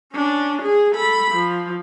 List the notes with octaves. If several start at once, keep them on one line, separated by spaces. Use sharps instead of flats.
C#4 D4
G#4
A4 B5
F3